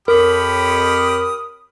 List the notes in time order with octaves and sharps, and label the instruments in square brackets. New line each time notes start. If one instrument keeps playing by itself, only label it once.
[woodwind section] F2 C#5 B5 [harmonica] G4 D#6 F6 [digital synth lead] A#4